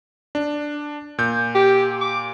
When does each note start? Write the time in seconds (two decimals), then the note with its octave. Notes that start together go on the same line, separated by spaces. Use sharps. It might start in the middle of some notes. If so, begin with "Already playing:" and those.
0.35 D4
1.18 A#2 G6
1.55 G4
2.01 D6